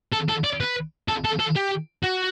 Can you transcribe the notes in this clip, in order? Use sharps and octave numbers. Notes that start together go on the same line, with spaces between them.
A4
A4
D5
B4
A4
A4
A4
G4
F#4